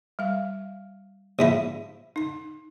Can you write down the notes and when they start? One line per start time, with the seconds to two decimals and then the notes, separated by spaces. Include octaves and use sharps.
0.19 G3 F5
1.39 A#1 G#2 E4
2.16 D#4